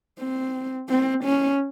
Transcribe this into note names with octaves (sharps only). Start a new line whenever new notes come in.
C4
C4
C#4